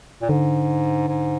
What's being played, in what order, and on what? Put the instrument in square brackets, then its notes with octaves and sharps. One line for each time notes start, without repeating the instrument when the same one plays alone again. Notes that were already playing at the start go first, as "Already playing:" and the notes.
[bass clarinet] A#2
[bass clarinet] G#2 [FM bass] D3
[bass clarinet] G#2